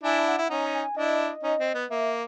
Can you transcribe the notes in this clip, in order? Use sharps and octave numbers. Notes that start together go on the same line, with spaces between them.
D4 E4 G#5
F#5
E4
C#4 D#4
G#5
D4 E4 D#5
C#4 D#4
C4
B3
A#3 E5